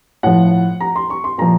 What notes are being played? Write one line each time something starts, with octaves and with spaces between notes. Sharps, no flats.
A2 F3 F#5
A#5
C6
C#6
C6
A#2 F3 A#5